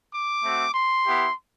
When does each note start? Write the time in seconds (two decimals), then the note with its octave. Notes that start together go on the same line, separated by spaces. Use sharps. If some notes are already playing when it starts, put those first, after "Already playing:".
0.13 D6
0.43 A3 C4 F#4
0.74 C6
1.05 B3 E4 G4